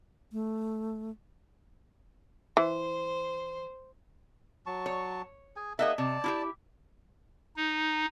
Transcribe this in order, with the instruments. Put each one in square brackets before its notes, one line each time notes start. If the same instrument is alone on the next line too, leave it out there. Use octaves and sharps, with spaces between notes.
[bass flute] A3
[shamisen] E3 [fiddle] C5
[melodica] F#3 A5 C#6
[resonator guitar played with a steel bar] C#5
[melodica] G#4 G#5
[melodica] A#3 D#4 F#5 [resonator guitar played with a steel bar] G#4 D#5 E5
[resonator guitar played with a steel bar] C3 [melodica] D5 A5
[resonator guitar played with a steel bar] E4 F4 G4
[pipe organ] D#4